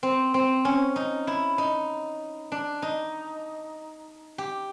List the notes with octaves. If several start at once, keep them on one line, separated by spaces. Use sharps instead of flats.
C4
C4
C#4
D#4
E4
D#4
D4
D#4
G4